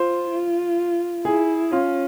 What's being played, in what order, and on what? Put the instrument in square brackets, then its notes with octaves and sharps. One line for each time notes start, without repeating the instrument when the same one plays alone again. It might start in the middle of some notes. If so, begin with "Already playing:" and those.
Already playing: [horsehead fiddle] F4 [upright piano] C5
[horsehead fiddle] F4
[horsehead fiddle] E4 [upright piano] G#4
[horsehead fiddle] C#4 [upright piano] F4